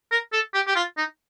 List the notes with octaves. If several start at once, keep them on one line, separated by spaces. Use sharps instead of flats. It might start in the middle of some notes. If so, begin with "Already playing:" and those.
A#4
A4
G4
G4
F4
D#4